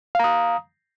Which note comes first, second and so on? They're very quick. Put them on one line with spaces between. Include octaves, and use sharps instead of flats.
F5 A#5 D#6